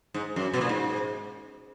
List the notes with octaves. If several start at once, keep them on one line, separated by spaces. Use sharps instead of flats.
G#2
F#2
B2
A#2
G#2